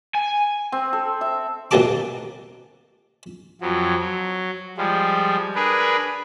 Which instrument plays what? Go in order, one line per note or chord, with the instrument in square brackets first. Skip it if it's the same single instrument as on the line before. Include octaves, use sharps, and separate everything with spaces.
[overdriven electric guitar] G#5
[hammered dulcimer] C4
A4
E5
[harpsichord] C#2 B2 A#3 G4 A5 D6
[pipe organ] F2 F3 F#3
F#3
F3 G3 G#3
D4 G#4 A#4 B4